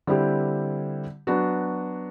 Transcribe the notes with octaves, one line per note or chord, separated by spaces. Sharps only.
D3 G3 C4 E4 G4
F#3 B3 D4 F#4